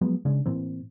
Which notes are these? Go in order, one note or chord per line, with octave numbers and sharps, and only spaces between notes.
F3 F#3 G#3 B3
C#3 G#3 C#4 D4
A2 E3 A#3 C4